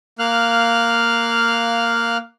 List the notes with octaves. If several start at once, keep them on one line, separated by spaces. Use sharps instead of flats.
A#3 F5 F6 F#6